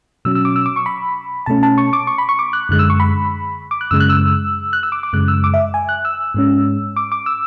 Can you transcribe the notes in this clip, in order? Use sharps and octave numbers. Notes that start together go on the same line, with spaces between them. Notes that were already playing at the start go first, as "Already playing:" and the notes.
B2 F#3 C#4 E6
E6
D6
E6
D6
C#6
B5
B2 A3 C#4 A5
A5
C#6
D6
C#6
B5
C#6
D6
F#6
F#2 D3 G#3 F#6
E6
C#6
B5
D6
F#6
F#2 C#3 G#3 E6
F#6
E6
F#6
E6
D6
D6
F#2 C#3 G#3 F#6
E6
D6
E5
G#5
F#6
E6
G#2 G#3 C#4
D6
D6
E6